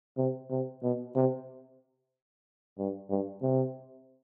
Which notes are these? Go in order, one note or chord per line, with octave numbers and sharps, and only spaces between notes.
C3
C3
B2
C3
G2
G2
C3